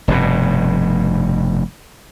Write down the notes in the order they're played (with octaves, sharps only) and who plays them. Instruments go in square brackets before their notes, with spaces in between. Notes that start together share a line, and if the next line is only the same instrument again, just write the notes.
[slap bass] F1 G2 B2